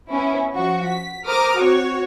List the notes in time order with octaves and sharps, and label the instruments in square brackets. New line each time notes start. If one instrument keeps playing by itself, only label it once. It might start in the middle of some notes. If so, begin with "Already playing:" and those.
[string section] B3 C#4 E4
F3 F#4 C#6
B6
A#4 C5 A#5 D6 D#6 F6
C4 F#4 C#5